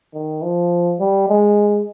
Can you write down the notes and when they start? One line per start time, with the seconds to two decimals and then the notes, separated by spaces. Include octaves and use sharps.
0.14 D#3
0.42 F3
0.99 G3
1.29 G#3